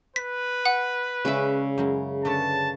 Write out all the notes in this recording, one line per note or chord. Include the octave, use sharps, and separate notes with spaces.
B4 B6
F#5
C#3 G#3 C#4 D5 E5
F#2 G#3 E4
D3 B4 C#5 A5